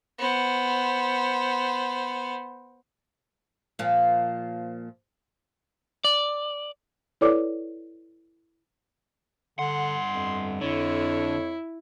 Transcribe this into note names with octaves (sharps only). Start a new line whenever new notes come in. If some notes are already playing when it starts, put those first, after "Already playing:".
B3 C5
A#2 F3
D5
E4 A4 B4 C#5 D5 D6
G2 D3 F#5 C6
F2
F2 D3 E4 C#5